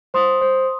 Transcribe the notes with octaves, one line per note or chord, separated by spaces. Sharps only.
C5 C6 D#6
C5